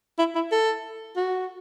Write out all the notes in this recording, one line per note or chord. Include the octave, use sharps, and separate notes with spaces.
E4
E4
A4
F#4